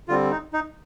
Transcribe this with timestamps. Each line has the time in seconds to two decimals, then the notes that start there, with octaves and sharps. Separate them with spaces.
0.08 D3 G3 C4 F4
0.31 D#4
0.53 D#4